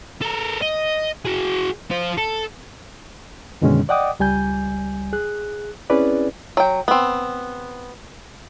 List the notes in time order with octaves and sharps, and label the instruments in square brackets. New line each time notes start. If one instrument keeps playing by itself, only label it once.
[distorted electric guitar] A4 A#4
D#5
F#4 G#4
F4 C5
A4
[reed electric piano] F#2 B2 D3 D#3 G#3 C#4
D5 D#5 F#5 G5 D6 D#6
C#2 G3 G#5 G6
G#4 F#6
C4 C#4 E4 G#4 B4 D5
[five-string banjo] F#3 G5
B3 C4